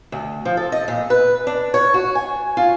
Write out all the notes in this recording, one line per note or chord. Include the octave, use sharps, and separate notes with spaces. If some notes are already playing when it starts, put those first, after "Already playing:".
D2
F3
A4
D#5
A#2
B4
D4
C#5
F#4
G#5
F4